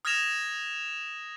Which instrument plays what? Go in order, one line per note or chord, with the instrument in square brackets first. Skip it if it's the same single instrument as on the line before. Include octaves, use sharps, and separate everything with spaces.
[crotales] D#6 F6 G#6 A#6 E7 F7